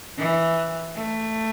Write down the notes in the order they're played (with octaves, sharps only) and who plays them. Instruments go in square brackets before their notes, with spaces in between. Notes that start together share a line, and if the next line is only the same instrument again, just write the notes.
[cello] E3
A3